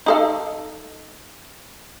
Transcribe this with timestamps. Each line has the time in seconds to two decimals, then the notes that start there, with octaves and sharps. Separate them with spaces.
0.06 D#4 A4 F5